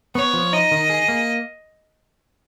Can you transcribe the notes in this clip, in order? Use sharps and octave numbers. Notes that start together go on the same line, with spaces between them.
B3 C#5
F3
D#4 D#5
D#3
G#4
A#3